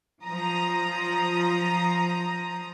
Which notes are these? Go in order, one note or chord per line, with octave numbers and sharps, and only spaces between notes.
F3 A#5 D#6